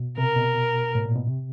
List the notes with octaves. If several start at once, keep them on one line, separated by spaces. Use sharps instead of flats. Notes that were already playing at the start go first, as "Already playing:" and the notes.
Already playing: B2
C3 A#4
B2
A2
A#2
B2
C3